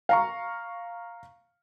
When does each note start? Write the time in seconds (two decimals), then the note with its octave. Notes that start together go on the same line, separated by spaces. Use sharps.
0.09 F5 A#5 C#6